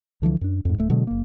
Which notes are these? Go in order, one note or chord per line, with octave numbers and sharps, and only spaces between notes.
C#2 D3 E3 F3
F#2 D4
F2 G#2
D1 A3
B2 D3 F#3 G#3
F#1 A#3